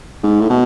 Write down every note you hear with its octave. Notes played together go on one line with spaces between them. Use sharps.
G#2
A2
B2